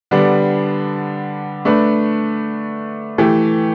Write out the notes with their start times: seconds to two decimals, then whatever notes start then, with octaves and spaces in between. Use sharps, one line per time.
0.11 D3 G3 B3 D4
1.65 A3 D4 B4
3.18 E3 A3 G4